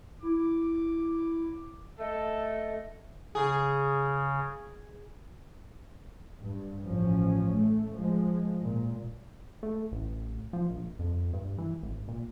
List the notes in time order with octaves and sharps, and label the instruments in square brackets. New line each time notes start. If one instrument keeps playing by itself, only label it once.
[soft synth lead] E4 [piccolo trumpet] D6
[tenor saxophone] A3 [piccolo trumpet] A4 [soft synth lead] D#5
[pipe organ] C#3 [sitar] G#4
[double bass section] G2
A1 F3 C#4
A3
F3 G#3
A#2
[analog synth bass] A3
A1
F3
A#1
F2
G2
E3
G#1
A#2